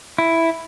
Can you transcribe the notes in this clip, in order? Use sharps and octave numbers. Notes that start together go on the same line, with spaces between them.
E4